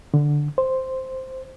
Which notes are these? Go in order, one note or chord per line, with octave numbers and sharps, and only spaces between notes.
D3
C5